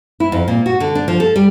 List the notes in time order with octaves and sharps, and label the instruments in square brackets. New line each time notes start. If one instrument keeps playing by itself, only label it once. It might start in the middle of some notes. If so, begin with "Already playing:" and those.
[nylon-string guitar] E4
F2
A#2
F#4
D3
D4
F3
A4
G3